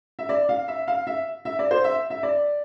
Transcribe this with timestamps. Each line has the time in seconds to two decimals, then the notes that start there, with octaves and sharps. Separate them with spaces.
0.19 E5
0.29 D5
0.49 F5
0.68 E5
0.88 F5
1.07 E5
1.45 E5
1.59 D5
1.71 C5
1.84 E5
2.10 E5
2.23 D5